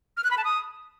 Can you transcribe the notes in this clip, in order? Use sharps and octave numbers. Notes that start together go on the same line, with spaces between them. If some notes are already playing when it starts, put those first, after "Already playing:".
F6
F#6
B5
A5
D#6